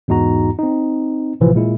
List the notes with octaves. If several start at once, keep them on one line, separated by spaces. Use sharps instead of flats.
E2 G#2 D#4 F#4 A#5
C4 D#4
A1 A2 C3 E3 F3
A#2 G#3 E4